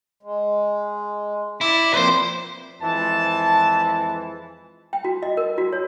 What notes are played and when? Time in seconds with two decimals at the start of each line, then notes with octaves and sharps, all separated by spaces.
0.23 G#3
1.61 E4 D5
1.94 F3 A#3 C4 B4 C5
2.82 F2 E3 G#3 A5
4.93 G5
5.05 F#4
5.23 D#5
5.37 A#4
5.58 F#4
5.73 C#5